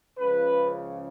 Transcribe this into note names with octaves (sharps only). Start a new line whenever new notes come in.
C#2 C#3 F3 B4